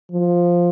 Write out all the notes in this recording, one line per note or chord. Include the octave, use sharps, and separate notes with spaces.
F3